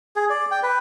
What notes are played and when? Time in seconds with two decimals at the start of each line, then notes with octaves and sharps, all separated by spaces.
0.16 G#4
0.30 D5
0.51 G5
0.63 B4